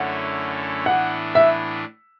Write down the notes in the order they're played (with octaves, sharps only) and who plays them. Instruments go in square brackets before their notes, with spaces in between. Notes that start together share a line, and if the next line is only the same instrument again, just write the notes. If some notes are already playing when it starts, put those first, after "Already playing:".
Already playing: [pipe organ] F#2 D3 A3 C#4 E4 [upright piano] F#5
[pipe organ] A2 E3 B3 D4 [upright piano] F#5
[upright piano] E5